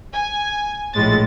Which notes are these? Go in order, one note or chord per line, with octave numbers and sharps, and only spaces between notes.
G#5
A#1 A2 G#3 A6